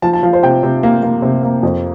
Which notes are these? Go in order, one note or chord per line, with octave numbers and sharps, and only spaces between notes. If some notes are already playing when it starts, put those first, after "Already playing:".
F3 A5
A5
F3 F5
C5
C3 G5
C3
A#3
A#3
C3
A#3
F2